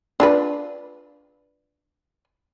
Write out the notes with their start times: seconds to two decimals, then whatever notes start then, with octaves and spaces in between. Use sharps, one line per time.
0.20 D4 F4 B4